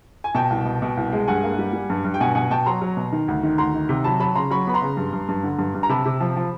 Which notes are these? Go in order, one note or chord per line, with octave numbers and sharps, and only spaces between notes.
G#5
B2 G5 A5
C2
B2
B2
C2
G#3
G2 F#5 G#5
A#3
G3
G3
G2
G2
G5
B2 F#5 G#5
B2 F#5 G#5
B2 G5 A5
F#3 A#5 C6
F#3
B2
D#3
D2
D#3
D2 A#5 C6
D#3
C3
F#3 A5 B5
F#3 A5 B5
C#3 A#5 C6
F#3 B5 C#6
B3 B5
A#5 C6
C#3
G2
G2
G2
D3
G2
G2
A#5
C3 A5 B5
C3
F3
F3